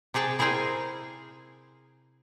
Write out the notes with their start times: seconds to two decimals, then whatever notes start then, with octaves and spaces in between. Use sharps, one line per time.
0.14 C3 G4 G#4 G5 A5
0.39 E4 G#4 A#4 C5 G5 G#5